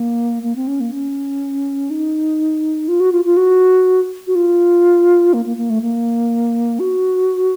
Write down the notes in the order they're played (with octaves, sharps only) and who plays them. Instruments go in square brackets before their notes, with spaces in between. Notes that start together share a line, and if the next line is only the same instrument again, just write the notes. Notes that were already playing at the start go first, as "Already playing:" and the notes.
Already playing: [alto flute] A#3
A#3
C4
C#4
A#3
C#4
D#4
F4
F#4
F4
F4
F#4
F#4
F4
A#3
A#3
A#3
A3
A#3
F#4